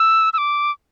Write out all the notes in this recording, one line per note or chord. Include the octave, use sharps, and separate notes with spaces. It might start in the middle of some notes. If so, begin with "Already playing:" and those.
Already playing: E6
E6
D6